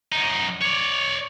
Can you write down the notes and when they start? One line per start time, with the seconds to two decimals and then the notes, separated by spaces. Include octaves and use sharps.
0.12 F#2 D#4
0.62 C#5 D5